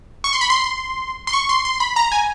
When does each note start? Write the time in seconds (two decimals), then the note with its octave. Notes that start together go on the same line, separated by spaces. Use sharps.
0.24 C#6
0.33 C6
0.41 B5
0.50 C6
1.27 C6
1.33 C#6
1.49 C6
1.65 C6
1.80 B5
1.96 A#5
2.12 G#5